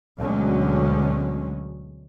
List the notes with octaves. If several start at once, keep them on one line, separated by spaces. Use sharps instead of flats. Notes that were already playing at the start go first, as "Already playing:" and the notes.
D2 B2 D3 F#3 G#3 C#4